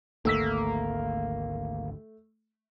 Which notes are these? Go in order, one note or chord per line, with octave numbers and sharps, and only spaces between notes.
G#1 D2 A3 A#3 E6 B6